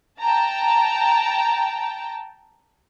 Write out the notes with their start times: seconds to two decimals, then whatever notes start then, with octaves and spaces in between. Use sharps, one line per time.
0.20 G5 A5 A#5